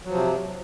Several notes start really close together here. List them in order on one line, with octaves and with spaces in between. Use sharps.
F#3 F3 C3